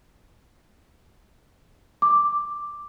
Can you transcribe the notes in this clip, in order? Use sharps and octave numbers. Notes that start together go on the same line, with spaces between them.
D6